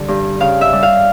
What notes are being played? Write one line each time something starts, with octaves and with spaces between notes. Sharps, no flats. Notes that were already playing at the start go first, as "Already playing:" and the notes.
Already playing: D3 G3
G2
C#3 F5
E5
G3
F5